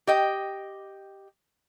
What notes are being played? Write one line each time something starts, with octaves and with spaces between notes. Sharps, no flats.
G4 D#5 G5